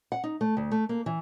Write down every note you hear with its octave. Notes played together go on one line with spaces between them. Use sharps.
F#5
D#4
A3
D2
A3
A#3
E3